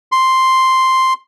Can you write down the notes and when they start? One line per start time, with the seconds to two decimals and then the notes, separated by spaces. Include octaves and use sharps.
0.12 C6